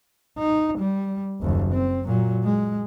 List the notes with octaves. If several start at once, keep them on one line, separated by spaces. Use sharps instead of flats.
D#4
G3
F#1 D#2
C4
A#2 F#3
G#3